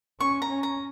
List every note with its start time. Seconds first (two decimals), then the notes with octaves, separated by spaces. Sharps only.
0.20 C#4 C#6
0.42 A#5
0.49 C#4
0.63 A#5